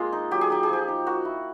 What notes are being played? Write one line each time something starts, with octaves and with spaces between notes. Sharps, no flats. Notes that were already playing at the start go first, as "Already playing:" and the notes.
Already playing: G#3 A#3 F4
D#4
F#3 G4
G#4
D#4 G4
G#4
F3 G4
D#4
A#3 F#4
E4